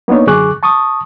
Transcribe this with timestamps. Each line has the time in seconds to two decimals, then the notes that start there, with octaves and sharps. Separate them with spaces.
0.08 A#3 B3 D4 D#4 C#5
0.27 F#2 D3 G#4 C#6 D6 F#6
0.63 A5 C#6 D#6